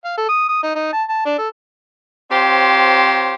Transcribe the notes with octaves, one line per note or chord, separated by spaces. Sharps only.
F5
A4
D#6
D#6
D#4
D#4
A5
A5
D4
A4
C4 F4 G4 C5 C#5 A#5